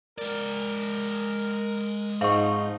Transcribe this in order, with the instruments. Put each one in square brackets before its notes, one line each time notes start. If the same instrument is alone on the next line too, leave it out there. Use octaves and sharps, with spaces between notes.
[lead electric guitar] G#3 D5 [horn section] A#4
[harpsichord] G#2 [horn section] F3 C4 D#4 [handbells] F5 C#6